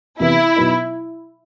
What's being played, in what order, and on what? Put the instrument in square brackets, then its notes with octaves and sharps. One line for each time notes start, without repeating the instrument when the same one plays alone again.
[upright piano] C3 E3 B3 [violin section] E4
[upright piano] B2 F#3 B3 D#4